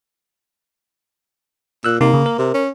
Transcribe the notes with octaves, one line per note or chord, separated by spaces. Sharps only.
A#2 E6 F#6
C3 A#3 D#4
C#3
A#4
C3
C#4